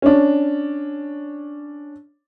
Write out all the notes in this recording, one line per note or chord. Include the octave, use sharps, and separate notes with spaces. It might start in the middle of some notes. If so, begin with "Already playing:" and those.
C#4 D4